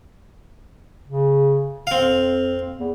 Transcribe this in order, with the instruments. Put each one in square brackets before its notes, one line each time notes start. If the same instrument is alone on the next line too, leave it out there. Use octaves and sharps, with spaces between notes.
[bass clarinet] C#3
[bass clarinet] F2 [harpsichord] C4 F5
[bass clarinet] E2